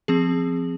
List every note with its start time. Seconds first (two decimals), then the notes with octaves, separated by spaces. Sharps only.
0.08 F3 C4 G#4